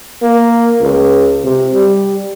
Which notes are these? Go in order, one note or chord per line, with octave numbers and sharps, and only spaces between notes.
A#3
C#2
C3
G3